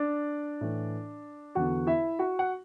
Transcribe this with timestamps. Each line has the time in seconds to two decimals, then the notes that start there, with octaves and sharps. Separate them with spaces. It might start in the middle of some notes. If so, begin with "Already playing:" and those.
Already playing: D4 D5
0.61 A2 E3
1.55 E2 D3 F#4 F#5
1.87 E4 E5
2.19 F#4 F#5
2.39 F#5